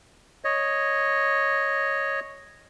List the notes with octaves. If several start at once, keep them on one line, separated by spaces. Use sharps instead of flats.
C#5 D#5